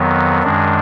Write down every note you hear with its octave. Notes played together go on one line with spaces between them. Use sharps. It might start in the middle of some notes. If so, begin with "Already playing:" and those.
Already playing: F2 D#3 F#3 B3
F#2 D#3 G#3 D4